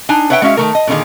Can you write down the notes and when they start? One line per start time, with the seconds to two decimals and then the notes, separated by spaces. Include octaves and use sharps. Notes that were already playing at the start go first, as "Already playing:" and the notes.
0.09 D4 D#4 G#5
0.30 B4 C#5 E5 F#5 G5
0.42 G#3 C#4 F#4 E5 F5
0.57 D#3 A3 A#4
0.75 D#5
0.87 A#2 D3 D#3 D#4 G#4